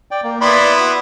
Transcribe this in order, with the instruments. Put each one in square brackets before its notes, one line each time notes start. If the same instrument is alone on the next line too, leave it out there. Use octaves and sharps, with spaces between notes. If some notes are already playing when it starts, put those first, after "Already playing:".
[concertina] D5 G5
A#3
[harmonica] B3 E4 [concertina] D5 B5 C6
[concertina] F#4